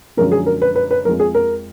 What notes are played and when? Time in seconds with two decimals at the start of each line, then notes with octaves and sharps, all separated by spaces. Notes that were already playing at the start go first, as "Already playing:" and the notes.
0.17 F#2 D3 F3 G#3 A#4
0.32 G#4
0.46 A#4
0.62 B4
0.76 B4
0.91 B4
1.05 F2 F3 G#3 A#4
1.20 G#4
1.35 A#4